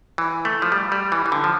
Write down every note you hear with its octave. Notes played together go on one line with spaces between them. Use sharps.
E3
A3
F3
G3
G3
E3
E3
D3
F3